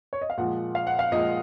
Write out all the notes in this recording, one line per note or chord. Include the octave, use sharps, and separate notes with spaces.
C#5
D#5
F5
A#2 F3 G#3 F#5
F5
F#5
F5
A#2 F3 G#3 D#5